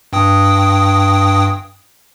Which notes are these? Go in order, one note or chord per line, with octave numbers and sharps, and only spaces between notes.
G2 G5 D#6